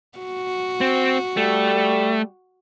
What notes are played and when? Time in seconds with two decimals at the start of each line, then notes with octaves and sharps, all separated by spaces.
0.19 F#4
0.81 C4
1.37 G3 A3